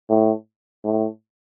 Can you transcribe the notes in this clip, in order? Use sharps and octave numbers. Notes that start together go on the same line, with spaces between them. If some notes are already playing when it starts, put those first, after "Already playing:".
A2
A2